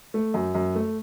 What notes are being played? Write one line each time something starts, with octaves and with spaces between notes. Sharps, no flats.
A3
F#2
F#2
A3